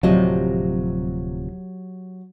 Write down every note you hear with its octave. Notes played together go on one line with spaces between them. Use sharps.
D1 C3 F3 F#3 G4 D#5